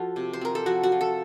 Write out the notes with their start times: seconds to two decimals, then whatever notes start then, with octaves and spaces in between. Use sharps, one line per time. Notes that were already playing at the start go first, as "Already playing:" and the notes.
Already playing: F3 F4 F#4 A4
0.16 C3
0.33 C5
0.41 C4 A#4
0.55 A4
0.66 F3 F#4
0.83 F#4
0.92 F4
1.01 A4